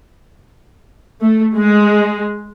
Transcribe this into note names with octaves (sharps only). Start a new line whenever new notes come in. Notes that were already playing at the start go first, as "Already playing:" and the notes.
A3
G#3